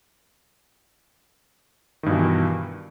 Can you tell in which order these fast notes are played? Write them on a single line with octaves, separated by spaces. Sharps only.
D#3 G2 B2 E3